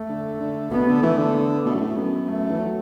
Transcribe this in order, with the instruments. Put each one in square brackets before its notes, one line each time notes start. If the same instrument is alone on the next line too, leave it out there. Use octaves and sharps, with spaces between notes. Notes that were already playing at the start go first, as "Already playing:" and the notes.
Already playing: [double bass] A3
[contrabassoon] D3
D3
[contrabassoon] B2 [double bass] B3
[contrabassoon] D3
[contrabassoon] E3 [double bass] A3
[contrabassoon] D3
[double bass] B3
[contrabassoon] B2 [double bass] A3
[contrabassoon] F#2
A2
[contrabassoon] F#2 [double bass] B3
[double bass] A3
[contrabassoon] E3
F#3